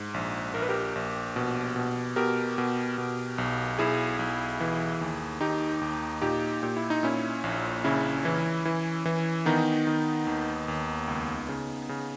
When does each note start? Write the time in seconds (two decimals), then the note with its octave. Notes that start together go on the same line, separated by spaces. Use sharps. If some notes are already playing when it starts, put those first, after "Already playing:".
Already playing: G#2
0.14 A#1
0.54 A#1 A#4
0.62 B4
0.69 G4 A#4
0.95 A#1
1.36 B2
1.76 B2
2.16 B2 G4 A#4
2.58 B2
2.98 B2
3.38 B1
3.78 B1 E4 G#4
4.19 B1
4.60 E3
5.01 D#2
5.40 D#2 D#4 G4
5.81 D#2
6.21 A#2 D#4 G4
6.63 A#2 G4
6.77 E4
6.90 D#4
7.03 A#2 C#4 E4
7.44 A#1
7.84 C#3 C#4 E4
8.25 E3
8.65 E3
9.05 E3
9.46 D#3 B3 D#4
9.87 D#3
10.27 D#2
10.68 D#2
11.08 C#2
11.48 C#3
11.89 C#3